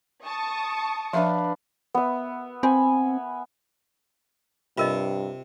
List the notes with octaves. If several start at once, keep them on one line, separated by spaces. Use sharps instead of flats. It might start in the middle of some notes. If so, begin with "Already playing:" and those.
A5 C#6 D#6
F3 D4 B4 E5 F5
B3 E5
C4 G#5 B5
G2 C3 F4 A#4 D#5